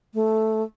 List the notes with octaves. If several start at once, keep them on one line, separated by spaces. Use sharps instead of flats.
A3